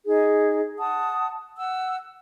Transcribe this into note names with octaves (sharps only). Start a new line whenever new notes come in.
D#4 G#4
F#5 A5 D#6
F#5 E6